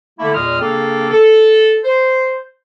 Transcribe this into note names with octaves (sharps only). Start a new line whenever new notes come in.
D3 A3 A#3 E4
E2 A#2 G#3 D#6 F6
C#3 A#3 C4 D4 G4 A4
A4
C5